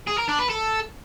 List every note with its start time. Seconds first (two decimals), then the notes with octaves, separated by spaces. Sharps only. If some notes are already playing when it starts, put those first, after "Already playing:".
0.08 G#4
0.18 A#4
0.29 D4
0.39 B4
0.50 A4